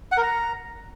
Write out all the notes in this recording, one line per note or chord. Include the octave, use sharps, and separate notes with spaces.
F#5
A#4
A#5